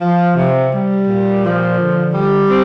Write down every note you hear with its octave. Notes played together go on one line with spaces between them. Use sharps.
F3
C3
G3
A#2
F3
D3
G3
C4